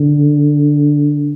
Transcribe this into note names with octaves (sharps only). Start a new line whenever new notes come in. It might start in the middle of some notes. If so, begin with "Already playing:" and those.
Already playing: D3